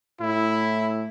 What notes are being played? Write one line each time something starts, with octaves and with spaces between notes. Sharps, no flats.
A2 E4